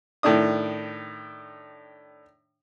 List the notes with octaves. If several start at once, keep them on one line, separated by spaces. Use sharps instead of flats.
A2 D#3 D4 D#6